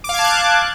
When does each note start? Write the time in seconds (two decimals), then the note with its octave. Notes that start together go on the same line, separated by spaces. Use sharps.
0.04 D6
0.09 F5
0.14 G#6
0.19 A5
0.24 F#6